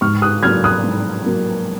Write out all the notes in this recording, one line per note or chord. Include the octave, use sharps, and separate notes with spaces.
G#2 C#6 F6
D#6 F#6
F#3 A#3 F6 G#6
D#6 F#6
G#2
F#3 A#3